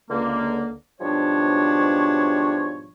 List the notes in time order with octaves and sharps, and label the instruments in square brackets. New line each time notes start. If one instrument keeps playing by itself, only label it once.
[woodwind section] C#2 D3 A#3
G#2 B2 F3 G3 D4 C#5